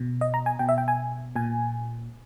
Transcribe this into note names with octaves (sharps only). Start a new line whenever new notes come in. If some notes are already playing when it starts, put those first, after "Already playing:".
Already playing: B2
D#5
A#5
G#5
B2 G5
E5
G5
G#5
A#2 G#5